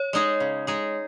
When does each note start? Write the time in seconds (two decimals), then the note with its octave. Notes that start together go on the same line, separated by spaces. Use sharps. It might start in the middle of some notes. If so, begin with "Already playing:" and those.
Already playing: C#5
0.13 G#3 D#4 G#4
0.40 C#3
0.67 G#3 D#4 G#4